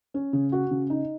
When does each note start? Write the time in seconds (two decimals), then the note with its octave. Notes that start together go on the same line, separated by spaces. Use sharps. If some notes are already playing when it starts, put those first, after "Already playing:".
0.14 C#4
0.33 C#3
0.52 F#4
0.71 C#3
0.90 D#4